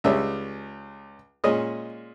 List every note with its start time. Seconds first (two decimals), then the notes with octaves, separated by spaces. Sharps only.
0.04 C#2 C#3 G3 C#4 E5
1.44 A#2 G#3 C#4 D#5